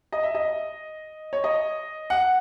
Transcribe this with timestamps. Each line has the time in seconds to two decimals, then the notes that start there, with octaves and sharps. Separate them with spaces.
0.12 D#5
0.23 E5
0.35 D#5
1.33 C#5
1.44 D#5
2.10 F#5